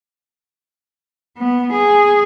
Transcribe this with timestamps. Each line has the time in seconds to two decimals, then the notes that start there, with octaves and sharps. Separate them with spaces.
1.38 B3
1.73 G#4